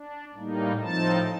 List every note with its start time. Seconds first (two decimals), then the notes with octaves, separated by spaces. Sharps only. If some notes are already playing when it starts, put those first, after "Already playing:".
Already playing: D4
0.34 A2 G3 A#3 D#4
0.81 A2 F3 C4 D#4 A5